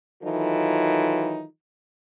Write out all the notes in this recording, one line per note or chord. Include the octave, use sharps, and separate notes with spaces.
D#3 E3 F#3 D#4 F4 A4